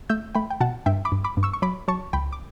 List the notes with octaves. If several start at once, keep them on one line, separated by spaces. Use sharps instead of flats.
A3 E6 G6
A3 G5 B5
G5
B2 F#5 A5
G2 E5 G5
B5 D6
G2
B5 D6
G2
C#6 E6
C#6
F#3 B5 D6
F#3 A5 C#6
C#2 G5 B5
D6